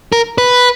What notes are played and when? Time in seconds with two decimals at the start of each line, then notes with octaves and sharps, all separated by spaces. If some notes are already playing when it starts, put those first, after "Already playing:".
0.12 A#4
0.38 B4